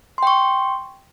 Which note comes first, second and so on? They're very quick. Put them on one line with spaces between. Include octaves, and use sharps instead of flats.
C6 G5 C#6